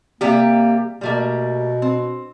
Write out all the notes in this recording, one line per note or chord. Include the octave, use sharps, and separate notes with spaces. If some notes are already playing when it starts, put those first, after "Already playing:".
C3 G3 A#3 G4
B2 G3 A3 A#3
C4